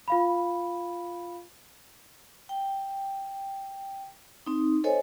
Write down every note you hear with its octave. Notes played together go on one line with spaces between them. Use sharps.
F4 F5 B5
G5
C4 D#4
A4 C5 C#5 D#5 G#5